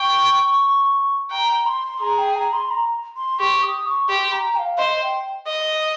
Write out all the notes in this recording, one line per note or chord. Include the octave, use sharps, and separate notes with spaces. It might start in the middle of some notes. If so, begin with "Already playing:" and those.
Already playing: G5 C#6
G5 A#5
C6
G#4 A#5
G5
A#5
C6
A#5
C6
G4 C#6
D#6
C#6
G4 C6
A#5
G5
F5
C5 D#5
G5
D#5